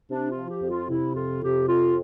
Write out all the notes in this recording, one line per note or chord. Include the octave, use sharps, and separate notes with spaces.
C3 D4
F4
F3
G4
F2
F4
C3 E4
F2 F4
C3 G4
F2 F4